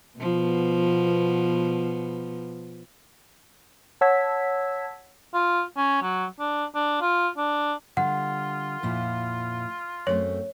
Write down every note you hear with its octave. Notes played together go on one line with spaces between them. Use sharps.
B2 F3 B3
C#5 F#5 A5 E6 G#6 B6
F4
C#4
F#3
D4
D4
F4
D4
D3 G3 F4 G4 F#5
F2 A#2 E4
F#2 A3 C4 C#5